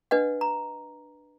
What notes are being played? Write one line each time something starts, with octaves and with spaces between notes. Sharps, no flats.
D4 B4 D#5 F#5
A#5